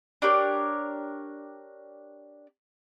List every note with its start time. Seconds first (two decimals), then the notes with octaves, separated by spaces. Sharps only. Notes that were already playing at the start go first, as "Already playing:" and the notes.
0.22 D4 G4 A#4 C#5